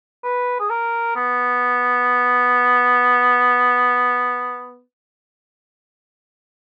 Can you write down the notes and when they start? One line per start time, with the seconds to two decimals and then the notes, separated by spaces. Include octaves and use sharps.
0.24 B4
0.60 G#4
0.70 A#4
1.16 B3